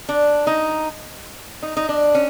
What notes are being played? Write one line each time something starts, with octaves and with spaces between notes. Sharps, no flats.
D4
D#4
D#4
D#4
D4
C#4